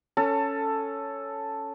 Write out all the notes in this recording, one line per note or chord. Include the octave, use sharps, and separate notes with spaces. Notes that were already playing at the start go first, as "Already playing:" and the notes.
C#4 A4